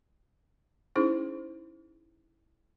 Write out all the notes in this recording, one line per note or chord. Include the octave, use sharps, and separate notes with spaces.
C#4 D#4 E4 G#4 C5